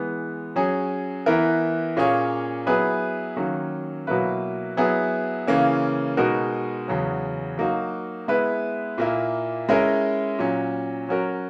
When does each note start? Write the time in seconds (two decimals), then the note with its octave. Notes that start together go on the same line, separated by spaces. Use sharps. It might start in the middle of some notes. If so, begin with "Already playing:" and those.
Already playing: E3 G#3 B3
0.56 F#3 C#4 G#4
1.26 E3 B3 E4 A#4
1.97 A#2 A#3 C#4 G#4 C#5
2.67 F#3 B3 E4 G#4 B4
3.36 D#3 F#3 A#3 C#4
4.07 B2 F#3 A#3 E4 B4
4.77 F#3 B3 E4 G#4
5.47 C#3 E3 A#3 C#4
6.17 B2 G#3 D#4 F#4 A#4
6.88 E2 C#3 F#3 C#4
7.58 F#3 A#3 D#4 F#4
8.28 G#3 B3 E4 B4
8.98 A#2 A#3 E4
9.69 G#3 C#4 E4 A#4
10.39 A#2 F#3 C#4
11.09 F#3 C#4 F#4 A#4